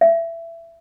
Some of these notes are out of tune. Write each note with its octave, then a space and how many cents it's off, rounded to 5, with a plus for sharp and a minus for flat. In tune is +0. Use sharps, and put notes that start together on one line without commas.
E5 +20